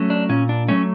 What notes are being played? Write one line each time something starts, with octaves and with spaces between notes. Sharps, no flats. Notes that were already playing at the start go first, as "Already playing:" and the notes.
Already playing: F#3 A3 C#4
D4
A#2 C#4
D4
F#3 A3 C#4